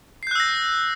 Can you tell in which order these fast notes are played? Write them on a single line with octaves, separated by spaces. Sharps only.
C7 G6 F#6 E6 A#6